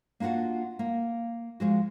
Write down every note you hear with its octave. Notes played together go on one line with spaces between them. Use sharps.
A#3 D4 F4 F#4 F#5
A#3
F3 G#3 F#4